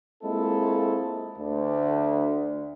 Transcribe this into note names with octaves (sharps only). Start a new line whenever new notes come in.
G#3 A#3 C4 E4 F4 A4
D2